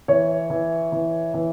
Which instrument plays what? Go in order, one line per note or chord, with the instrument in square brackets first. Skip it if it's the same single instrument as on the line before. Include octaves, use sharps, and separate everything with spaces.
[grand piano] E3 C#5
E3
E3
E3